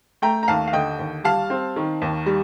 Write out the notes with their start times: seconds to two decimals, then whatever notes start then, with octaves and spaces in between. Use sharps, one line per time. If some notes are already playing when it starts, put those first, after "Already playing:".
0.22 A3 G5 A#5
0.43 A#5
0.48 D#2 F5 A5
0.68 F5
0.73 D3 D#5 G5
0.99 D#2
1.24 G3 F5 A5
1.50 C4
1.76 D#3
2.02 D#2
2.26 G3